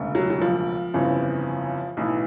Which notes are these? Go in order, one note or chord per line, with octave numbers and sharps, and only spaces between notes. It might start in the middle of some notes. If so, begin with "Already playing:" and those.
Already playing: E1 D2 C#3
F#3
F#3
F3
G1 F2 C#3 E3
B1 A2 E3